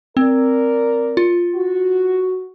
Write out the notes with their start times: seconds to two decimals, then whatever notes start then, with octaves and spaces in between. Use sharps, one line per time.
0.17 C4 A#4 D5
1.17 F4
1.55 F#4